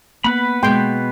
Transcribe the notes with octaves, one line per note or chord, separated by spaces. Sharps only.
A#3 B3 B4 F#5 B5
B2 G#3 G5 C6